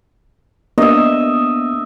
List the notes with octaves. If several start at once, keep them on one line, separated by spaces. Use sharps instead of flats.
A#3 B3 D4 D#5 E5